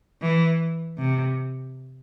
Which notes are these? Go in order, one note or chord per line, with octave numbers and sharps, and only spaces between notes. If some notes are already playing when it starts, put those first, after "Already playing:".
E3
C3